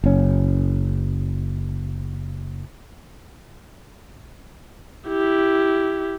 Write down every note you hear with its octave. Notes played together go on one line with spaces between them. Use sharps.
F#1 C#4
E4 G4